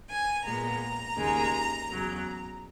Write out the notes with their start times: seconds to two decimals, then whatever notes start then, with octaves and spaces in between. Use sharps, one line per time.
0.09 G#5
0.45 A#2 G#3 B3 A#5
1.17 D#2 C#3 G#3
1.90 E2 C#3 F#3